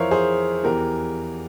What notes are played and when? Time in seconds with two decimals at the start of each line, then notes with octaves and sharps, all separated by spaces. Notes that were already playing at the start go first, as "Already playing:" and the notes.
Already playing: F2 E3 A#4 C5 C#5 E5 F5
0.11 G#4 C5
0.63 E2 E3 G4 A#4